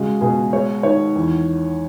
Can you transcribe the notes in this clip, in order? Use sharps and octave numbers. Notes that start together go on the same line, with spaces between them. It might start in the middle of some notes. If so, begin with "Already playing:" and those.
Already playing: C#3 G#3 F#4
B2 G#4
G#3 C#5
D#3 C#5
E2